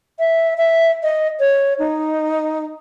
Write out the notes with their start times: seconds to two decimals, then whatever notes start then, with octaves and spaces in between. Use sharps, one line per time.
0.19 E5
0.58 E5
1.03 D#5
1.40 C#5
1.79 D#4